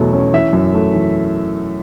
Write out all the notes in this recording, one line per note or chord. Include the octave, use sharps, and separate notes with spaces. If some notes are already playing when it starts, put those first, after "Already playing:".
Already playing: E2 B2 F#3 A3
C#4
E3 E5
F#2
A3
E3